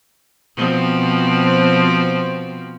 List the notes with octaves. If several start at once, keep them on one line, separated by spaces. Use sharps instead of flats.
B2 F3 C4